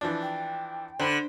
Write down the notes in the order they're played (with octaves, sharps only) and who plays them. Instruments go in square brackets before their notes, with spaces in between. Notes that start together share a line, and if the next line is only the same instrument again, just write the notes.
[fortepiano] E3 F3 D4
[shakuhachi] G5
[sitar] D3 [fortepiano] C5 B5